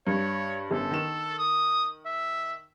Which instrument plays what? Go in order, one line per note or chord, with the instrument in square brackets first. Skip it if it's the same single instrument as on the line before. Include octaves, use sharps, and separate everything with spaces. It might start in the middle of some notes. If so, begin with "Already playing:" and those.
[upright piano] G2 [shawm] C#5
[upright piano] G1 C#4 [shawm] A4
[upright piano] D#3 E7
[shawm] D#6
E5